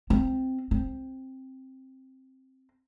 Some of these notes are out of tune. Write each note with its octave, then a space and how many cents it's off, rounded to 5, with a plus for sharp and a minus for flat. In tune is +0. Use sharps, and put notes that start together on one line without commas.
C4 -5
C4 +10